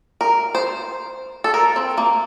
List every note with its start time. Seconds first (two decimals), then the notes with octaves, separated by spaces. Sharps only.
0.21 A#4
0.55 C5
1.44 A4
1.54 A#4
1.76 C4
1.98 A#3